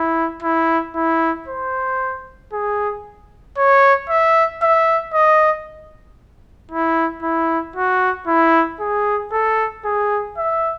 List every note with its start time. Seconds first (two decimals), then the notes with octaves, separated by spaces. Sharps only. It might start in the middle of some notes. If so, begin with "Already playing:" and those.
Already playing: E4
0.42 E4
0.95 E4
1.48 C5
2.53 G#4
3.57 C#5
4.09 E5
4.62 E5
5.14 D#5
6.71 E4
7.23 E4
7.76 F#4
8.27 E4
8.80 G#4
9.32 A4
9.85 G#4
10.38 E5